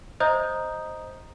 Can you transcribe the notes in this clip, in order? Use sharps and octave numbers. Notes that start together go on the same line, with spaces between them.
C5 D#5 E5 A#5 D#6 G6